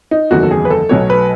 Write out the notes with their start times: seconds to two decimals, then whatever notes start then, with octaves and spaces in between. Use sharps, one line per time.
0.11 D#4
0.31 F#1 E2 D#3 F#3 A3 F#4
0.43 A4
0.51 G#4
0.65 B4
0.70 A4
0.89 B1 B2 F#3 A3 C#5
1.10 B4